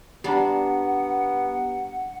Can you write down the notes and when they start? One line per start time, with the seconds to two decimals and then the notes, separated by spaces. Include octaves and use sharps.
0.24 G3 B3 D4 G4 F#5 A#5